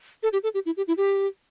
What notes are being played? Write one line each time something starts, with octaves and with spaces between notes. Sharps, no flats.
A4
G4
A4
G4
E4
G4
E4
G4